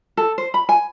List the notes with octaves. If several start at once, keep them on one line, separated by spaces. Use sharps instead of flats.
A4
C5
B5
G#5